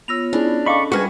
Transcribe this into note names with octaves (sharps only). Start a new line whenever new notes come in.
B3 F4 C#5 E6 A#6 F7
C#4 D4 E4 G#4
A4 D#5 F5 A5 B5 C#6 D6
G3 F#4 G#4 A#4 B4 G#5